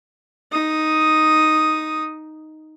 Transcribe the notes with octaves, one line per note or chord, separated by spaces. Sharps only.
D#4 D#6